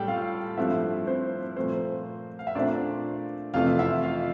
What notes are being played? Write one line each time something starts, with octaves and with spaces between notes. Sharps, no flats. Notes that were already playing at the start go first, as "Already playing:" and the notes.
Already playing: A2 G3 G4 A4 G5 A5
F4 F5
G2 F3 A3 C4 E4 E5
C4 C5
A#2 F3 A3 C4 C5
F5
E5
A#2 A3 C4 D4 D5
F2 C3 E3 A3 F4 F5
E4 E5
F4 F5